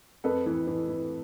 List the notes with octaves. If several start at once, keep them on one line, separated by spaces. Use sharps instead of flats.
F2 A4 B4
E3
E3
E3